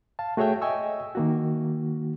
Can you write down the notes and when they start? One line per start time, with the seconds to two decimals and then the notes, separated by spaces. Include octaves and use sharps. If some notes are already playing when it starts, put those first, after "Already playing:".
0.19 F5 A5
0.37 A3 F#4 G#4 C#5 E5 G5
0.62 D#5 E5 G5 G#5 C#6 E6
1.15 D#3 A#3 F#4